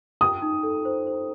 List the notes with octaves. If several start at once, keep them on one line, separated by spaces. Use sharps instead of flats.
G5 D#6
D#4
A4
C5
C5